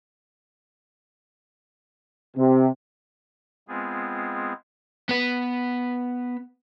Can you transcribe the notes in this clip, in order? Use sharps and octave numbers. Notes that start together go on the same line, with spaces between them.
C3
G#3 B3 C4 F4 G#4
B3 B4